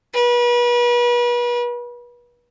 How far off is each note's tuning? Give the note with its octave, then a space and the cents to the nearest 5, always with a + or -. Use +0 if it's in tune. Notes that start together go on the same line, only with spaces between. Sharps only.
B4 -35